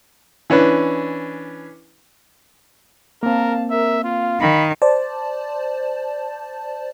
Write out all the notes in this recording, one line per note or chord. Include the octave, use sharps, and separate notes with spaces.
E3 C#4 D4 B4
A#3 C4 A#4 F5 A5
A#4 E5
F4 F5
D#3 B5
C5 D5 A5